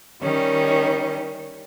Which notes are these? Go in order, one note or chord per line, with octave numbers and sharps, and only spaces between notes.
D#3 G3 C#4